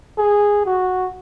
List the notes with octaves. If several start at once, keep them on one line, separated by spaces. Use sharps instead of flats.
G#4
F#4